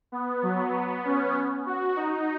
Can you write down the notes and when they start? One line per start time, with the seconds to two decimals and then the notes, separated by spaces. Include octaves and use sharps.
0.12 B3
0.43 F#3
0.74 B3
1.05 C#4
1.66 F#4
1.96 D#4